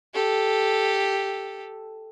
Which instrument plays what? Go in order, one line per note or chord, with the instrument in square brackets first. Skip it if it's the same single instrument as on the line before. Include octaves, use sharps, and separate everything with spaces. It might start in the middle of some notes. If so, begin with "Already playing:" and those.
[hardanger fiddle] G4 A4